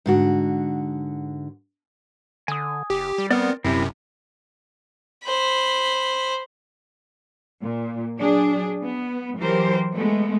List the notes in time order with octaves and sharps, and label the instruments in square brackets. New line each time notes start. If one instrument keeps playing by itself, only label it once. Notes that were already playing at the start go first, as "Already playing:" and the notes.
[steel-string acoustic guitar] G#2 D3 F#4
[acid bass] D3 [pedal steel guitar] G#5 D#6
[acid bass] F#1 [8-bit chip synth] G4
[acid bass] G3
[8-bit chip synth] B3 [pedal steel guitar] C4 A#4 D5
[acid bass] D#1 [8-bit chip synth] F#2 C3 [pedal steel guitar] C4 E4
[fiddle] C5 B5
[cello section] A#2
F#3 D4 G#4
B3
E3 F#3 G4 A#4 C5
G#3 A3 B3